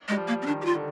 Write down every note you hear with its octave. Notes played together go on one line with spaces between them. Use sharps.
G#3
G3
F3
A#3
C4
D#3 D4
G4
F4
D3